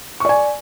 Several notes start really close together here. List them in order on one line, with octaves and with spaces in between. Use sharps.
C#6 D5 G#5